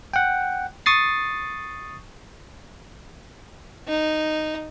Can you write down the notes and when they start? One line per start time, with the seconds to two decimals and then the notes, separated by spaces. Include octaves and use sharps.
0.14 F#5 G5
0.86 C#6 D#6 A6 C7
3.88 D#4